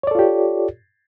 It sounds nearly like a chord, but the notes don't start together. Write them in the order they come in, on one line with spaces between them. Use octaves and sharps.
C#5 D5 A4 F4 G4